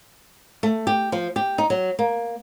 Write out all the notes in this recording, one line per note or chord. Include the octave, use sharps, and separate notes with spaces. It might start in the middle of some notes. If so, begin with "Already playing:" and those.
A3
G4
F3
G4
D#4
F#3
A#3